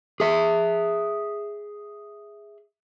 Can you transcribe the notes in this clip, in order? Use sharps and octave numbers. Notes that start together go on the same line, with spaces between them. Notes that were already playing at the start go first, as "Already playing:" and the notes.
G#4 E5